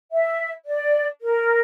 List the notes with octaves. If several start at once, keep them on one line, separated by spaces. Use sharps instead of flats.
E5
D5
A#4